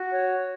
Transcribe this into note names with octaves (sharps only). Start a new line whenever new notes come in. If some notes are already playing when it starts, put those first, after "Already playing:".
Already playing: F#4
C#5